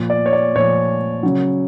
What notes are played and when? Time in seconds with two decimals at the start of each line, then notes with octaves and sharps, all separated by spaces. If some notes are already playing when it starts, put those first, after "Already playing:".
Already playing: A#2 F3
0.10 D5
0.26 C#5
0.33 D5
0.55 A#2 F3 C#5
1.23 C#3 F#3